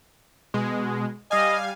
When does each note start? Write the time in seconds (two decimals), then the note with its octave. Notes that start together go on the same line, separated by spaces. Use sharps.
0.54 B2 G#3
1.31 G3 D#5 F5 G#5